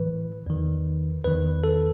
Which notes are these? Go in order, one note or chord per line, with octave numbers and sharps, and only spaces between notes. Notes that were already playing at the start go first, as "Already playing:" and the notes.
Already playing: A2 E3 B4
E2 D#3
E2 D#3 B4
A4